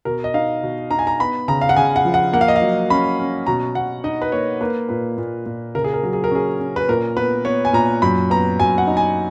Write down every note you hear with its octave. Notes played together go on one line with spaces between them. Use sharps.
B2 A#4
D#5
D#4 F5
B2
D#4 A#5
G#5
A#5
B3 B5
C#3 A#5
F5
F#5
C#3 G#5
F#5
F3
F#5
A#3 F#5
F5
D#5
F5
F#3
C#4 B5
C#4
B2 A#5
B2 F#5
D#4 D#5
B4
A#3 C#5
A#3 B4
A#2 B4
A#2
A#2
C#3 A#4
G#4
A#4
F#3
G#4
A#4
C#4 G#4
C#4
B4
A#2 A#4
B3 B4
B3 C#5
G#5
A#2 A#5
F#2 B5
B3 A#5
F#2 G#5
F#5
D#4
G#5